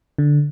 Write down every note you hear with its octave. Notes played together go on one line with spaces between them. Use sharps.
D3